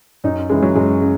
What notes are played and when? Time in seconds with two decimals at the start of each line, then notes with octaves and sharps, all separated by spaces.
0.24 F#2 D#4
0.50 C#3 E3 G#3
0.62 F#3
0.75 F#2 G#3
1.01 C#3